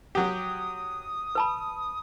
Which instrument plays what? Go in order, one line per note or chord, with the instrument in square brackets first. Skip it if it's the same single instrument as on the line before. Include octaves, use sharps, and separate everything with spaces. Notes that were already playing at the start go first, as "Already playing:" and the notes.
[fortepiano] F#3 G4 [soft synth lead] D#6
[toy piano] B4 A5 B5